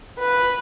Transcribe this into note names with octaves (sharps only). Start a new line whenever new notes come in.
B4